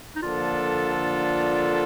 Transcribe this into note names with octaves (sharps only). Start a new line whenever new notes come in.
D#4
D3 F3 A#3 D4 F4 A4